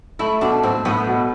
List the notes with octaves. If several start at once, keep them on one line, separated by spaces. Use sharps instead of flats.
A3 E4
B2 D4
A2 C4
A2 B3
B2